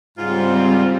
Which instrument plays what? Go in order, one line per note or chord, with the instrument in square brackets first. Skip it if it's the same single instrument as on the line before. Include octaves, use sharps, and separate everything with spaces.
[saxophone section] G#2 C#3 F4 [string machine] G3 C4